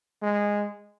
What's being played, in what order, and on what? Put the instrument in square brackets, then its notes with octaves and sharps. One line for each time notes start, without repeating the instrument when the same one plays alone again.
[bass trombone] G#3